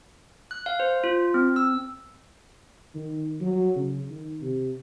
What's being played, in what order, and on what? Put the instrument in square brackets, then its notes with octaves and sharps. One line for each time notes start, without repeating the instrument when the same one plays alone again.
[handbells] F#6
F5
C5
F4
C4
E6
[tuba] D#3
F#3
C#3
D#3
C3